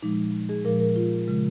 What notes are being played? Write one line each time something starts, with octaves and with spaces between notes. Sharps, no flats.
A#2 F3 G#3 D#4
G#4
A#2 F3 G#3 A#4
A#4
F4
C#3 F3 G#3